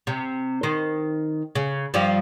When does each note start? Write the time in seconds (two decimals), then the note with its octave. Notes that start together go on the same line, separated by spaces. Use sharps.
0.07 C3
0.63 D#3 C5
1.55 C#3
1.94 G2 F3 G3